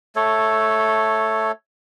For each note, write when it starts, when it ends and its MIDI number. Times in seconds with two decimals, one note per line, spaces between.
0.16 1.52 57
0.16 1.52 69
0.16 1.52 73